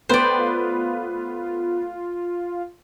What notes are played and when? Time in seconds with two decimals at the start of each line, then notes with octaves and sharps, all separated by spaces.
0.09 A3 B3 B4 C5 D5 G5
0.38 F4